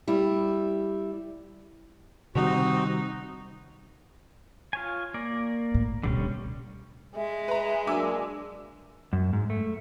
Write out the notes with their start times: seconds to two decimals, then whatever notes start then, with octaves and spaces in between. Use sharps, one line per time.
0.07 G3 E4
2.35 C3 D#3 G3 C4 D#4 F#4
4.73 F4 C#5 G#5
5.14 A#3 A#4 D5
5.74 A2
6.03 D1 B2 D3 G3 C#4
7.16 G#3 E5
7.48 B4 A#5
7.87 F#3 A#3 D4 G#5 D6 E6
9.13 F#2
9.33 G#2
9.50 A3